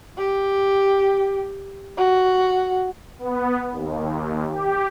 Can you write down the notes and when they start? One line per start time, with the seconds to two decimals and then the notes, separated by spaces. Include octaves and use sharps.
0.18 G4
1.97 F#4
3.19 B3
3.72 D#2
4.50 G4